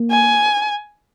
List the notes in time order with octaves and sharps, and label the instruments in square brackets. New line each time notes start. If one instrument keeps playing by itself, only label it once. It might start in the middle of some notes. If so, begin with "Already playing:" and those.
Already playing: [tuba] A#3
[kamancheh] G#5